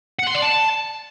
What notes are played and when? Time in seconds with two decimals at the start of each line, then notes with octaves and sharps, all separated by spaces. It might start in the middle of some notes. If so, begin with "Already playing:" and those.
0.19 F#5
0.27 C6
0.35 D5
0.43 A5